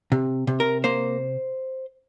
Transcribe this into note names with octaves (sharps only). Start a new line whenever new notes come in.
C3
C3
A#4
A#3 C5